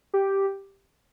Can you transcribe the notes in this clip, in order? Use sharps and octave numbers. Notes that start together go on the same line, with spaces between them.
G4